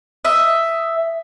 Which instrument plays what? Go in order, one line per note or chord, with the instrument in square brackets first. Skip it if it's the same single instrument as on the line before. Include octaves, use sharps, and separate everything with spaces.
[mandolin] D#5 E5